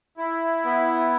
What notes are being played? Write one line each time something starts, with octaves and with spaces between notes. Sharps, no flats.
E4
B3